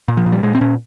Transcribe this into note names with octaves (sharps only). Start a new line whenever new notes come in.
A#2
F3
A#2
G3
A#2 G#3
C4
A#2 C#4